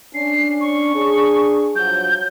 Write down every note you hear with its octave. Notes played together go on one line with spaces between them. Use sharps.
C#4 D4 C7
C#6
D4 G#4
G2 F3 F#3 G6